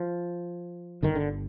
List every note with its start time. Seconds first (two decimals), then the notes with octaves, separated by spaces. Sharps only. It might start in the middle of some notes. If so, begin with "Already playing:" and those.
Already playing: F3
1.03 G1 G2 D3 D#3
1.15 D3